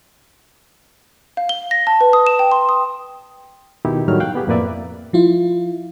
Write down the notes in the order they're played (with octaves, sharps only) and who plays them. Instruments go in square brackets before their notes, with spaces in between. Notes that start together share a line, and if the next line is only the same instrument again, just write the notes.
[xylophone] F5
G7
A#6
A5
B4
D#6
E7
G5
C6
D#6
[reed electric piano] B2 D#3 D#4 E4 G4
A2 D#3 F#3 G3 A3 F6
F5 G5 F#6
B3 G4 G#4
F2 A2 A#3 B4 D5 E5
[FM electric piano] F3 E4 F4